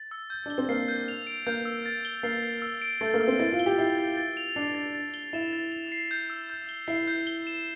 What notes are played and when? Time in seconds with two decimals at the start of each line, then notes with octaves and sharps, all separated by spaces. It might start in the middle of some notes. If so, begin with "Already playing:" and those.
Already playing: A6
0.11 E6
0.30 G6
0.46 D4 G7
0.58 C4
0.69 A#3 C7
0.88 G6
1.08 F7
1.27 D7
1.47 A#3 G6
1.65 E6
1.86 A6
2.05 G7
2.23 A#3 C7
2.43 A6
2.62 E6
2.82 D7
3.01 A3 A6
3.14 A#3
3.21 E6
3.28 C4
3.39 E4 A6
3.53 F4
3.59 G7
3.66 G4
3.78 E4 C7
3.98 A6
4.17 A6
4.37 F7
4.56 D4 C7
4.75 A6
4.95 A6
5.14 G7
5.33 E4 E7
5.53 A6
5.72 F7
5.92 C7
6.11 G6
6.30 E6
6.50 G6
6.69 G7
6.88 E4 C7
7.08 G6
7.27 G7
7.47 E7